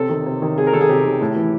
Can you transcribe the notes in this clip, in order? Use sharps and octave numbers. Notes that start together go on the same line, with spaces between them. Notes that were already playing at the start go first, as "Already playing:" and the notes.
Already playing: C3 A4
D#3
C3
D#3
C3 G#4
A#4
D#3 A4
G#4
C3 G4
D#3
A2
E3